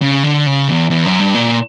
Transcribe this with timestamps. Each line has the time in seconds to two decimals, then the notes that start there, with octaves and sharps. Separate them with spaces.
0.02 C#3
0.24 D3
0.46 C#3
0.68 E2
0.90 E2
1.06 F#2
1.19 G2
1.35 A#2